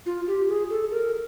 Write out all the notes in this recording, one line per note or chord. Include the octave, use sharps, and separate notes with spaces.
F4
G4
G#4
A4
A#4